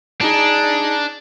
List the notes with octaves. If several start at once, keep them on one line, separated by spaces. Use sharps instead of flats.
D4 D#4 G#4